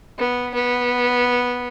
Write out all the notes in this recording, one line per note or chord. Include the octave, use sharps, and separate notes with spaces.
B3
B3